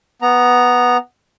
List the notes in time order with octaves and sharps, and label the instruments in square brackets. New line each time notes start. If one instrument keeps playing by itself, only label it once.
[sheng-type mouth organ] B3 A#5